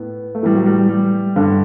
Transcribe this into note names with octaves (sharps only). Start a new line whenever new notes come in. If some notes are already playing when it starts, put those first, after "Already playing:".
Already playing: A2 B3
A3
A2 E3 G3
F#3
G3
G3
G3
G2 D3